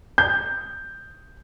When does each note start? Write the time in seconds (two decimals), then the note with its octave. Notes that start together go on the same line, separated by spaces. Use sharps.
0.18 G6